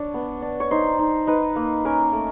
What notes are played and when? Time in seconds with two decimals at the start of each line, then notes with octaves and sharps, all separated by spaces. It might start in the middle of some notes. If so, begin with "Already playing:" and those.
Already playing: D4 C#5
0.14 B3
0.42 D4
0.60 C#5
0.71 D#4 C5
0.99 D#4
1.27 D#4 B4
1.56 A#3
1.85 C#4 A#4
2.13 A3